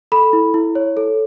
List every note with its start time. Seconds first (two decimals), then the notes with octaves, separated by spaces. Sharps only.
0.12 A4 B5
0.33 E4
0.54 E4
0.75 C#5
0.97 A4